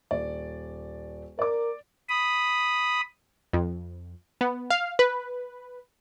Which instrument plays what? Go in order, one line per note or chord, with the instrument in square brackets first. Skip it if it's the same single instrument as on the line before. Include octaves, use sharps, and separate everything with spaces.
[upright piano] D#1 D5
[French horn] A#4 [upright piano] D5 D6
[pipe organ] B5 D#6
[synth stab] F2
B3
F5
B4